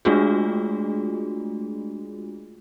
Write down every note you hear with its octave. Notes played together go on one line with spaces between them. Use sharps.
G#3 A3 D4 F4 F#4 G#4